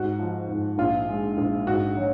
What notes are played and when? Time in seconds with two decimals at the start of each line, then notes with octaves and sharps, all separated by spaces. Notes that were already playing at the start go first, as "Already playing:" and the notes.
Already playing: G#2 F#4
0.19 F3
0.49 G#2
0.78 A#1 F4
1.08 G#3
1.37 A#1
1.67 G#2 F#4
1.97 F#3